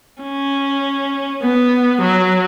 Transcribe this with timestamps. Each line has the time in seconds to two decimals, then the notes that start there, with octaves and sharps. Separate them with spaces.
0.23 C#4
1.43 B3
2.02 F#3